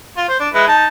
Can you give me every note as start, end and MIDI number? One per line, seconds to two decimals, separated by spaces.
0.17 0.25 65
0.28 0.38 72
0.40 0.49 62
0.54 0.66 56
0.54 0.66 64
0.54 0.66 71
0.68 0.86 63
0.68 0.86 81